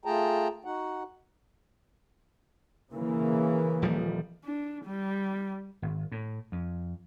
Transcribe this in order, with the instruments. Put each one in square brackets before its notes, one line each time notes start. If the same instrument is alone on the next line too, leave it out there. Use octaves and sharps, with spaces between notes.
[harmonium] A3 F4 G#4 G5 A5 A#5
D#4 F#4 F#5
[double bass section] C#3 E3 A#3
[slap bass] D#1 F3 G3
[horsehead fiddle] D4
G3
[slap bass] G#1
A2
F2